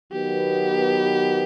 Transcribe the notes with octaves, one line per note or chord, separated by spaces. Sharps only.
D#3 F#3 B3 G4